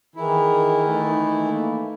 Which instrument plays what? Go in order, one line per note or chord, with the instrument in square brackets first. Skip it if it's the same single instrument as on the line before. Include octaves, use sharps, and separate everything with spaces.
[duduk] D#3 [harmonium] E3 E4 [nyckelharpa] G#4 A#4
[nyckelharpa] A3 D#4
[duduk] A#3